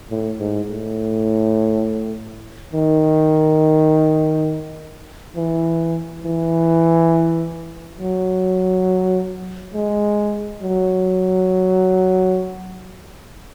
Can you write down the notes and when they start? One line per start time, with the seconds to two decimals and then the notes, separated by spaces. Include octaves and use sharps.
0.11 A2
0.40 G#2
0.69 A2
2.73 D#3
5.36 E3
6.24 E3
7.99 F#3
9.74 G#3
10.62 F#3